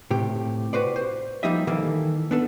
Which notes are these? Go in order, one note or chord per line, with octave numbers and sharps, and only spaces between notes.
A2 C3 G4
F#4 B4 C5 D5
C5
F3 G3 A#3 D#4 D#5 E5
D#3 E3 A#3 A4
B3 D4 A4